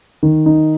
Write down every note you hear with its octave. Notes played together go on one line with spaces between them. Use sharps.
D#3
D#4